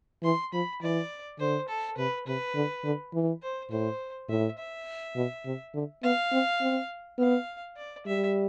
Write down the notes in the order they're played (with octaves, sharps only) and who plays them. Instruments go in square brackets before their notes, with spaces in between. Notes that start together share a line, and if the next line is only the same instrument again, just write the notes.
[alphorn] E3 [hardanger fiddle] C6
[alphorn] F3 [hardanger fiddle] B5
[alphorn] E3 [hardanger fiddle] D5
[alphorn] D3 [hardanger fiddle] C5
[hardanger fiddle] A4
[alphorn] C3 [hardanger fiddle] B4
[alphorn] C3 [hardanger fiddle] B4
[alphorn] D3
D3
E3
[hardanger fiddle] C5
[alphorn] A2 [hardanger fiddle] C5
[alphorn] A2 [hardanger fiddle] E5
[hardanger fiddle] E5
[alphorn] B2
C3
D3
[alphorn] B3 [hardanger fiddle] F5
[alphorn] C4
C4
[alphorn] B3 [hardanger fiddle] F5
[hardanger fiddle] D5
[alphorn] G3 [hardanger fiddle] E5